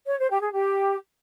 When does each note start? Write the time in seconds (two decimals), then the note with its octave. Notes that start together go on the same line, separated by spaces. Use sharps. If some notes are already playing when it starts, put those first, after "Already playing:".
0.07 C#5
0.18 C5
0.30 G4
0.41 G#4
0.53 G4